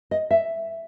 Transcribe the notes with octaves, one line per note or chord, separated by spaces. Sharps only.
D#5
E5